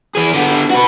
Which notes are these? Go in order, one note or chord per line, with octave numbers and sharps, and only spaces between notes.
E3 G#4
D3 B3
F#4 B4